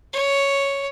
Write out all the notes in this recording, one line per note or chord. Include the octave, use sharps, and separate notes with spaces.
C#5